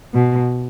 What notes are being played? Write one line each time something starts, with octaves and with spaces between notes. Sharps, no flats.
B2